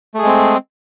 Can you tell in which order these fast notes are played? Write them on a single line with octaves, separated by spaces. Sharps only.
A3 G#4 G#3 C4